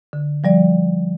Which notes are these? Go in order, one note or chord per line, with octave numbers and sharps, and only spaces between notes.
D3
F3 G3 D5